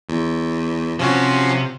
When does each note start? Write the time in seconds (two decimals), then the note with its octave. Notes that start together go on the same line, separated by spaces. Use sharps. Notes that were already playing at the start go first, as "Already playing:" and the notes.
0.09 E2
0.99 C3 F3 C#4 F#4